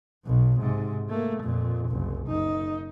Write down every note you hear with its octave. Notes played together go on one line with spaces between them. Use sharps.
B1 B2
G#2 C3
A3 A#3
F2 A#2
F#1 C2
F#1 D#4